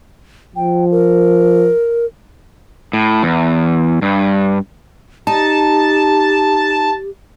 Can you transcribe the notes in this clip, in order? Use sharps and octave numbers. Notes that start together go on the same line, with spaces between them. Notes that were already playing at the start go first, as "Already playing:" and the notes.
F3 G5
A#4
A2
E2
G2
D#4 G4 A5